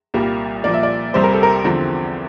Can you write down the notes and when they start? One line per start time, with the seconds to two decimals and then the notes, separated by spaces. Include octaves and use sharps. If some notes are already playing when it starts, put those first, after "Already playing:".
0.14 C2 A#2 G3 A#3
0.64 A#2 F3 A#3 D5
0.73 E5
0.83 D5
1.14 C2 C3 G3 C4 C5
1.24 A#4
1.34 A4
1.43 A#4
1.65 E2 D3 F3 C4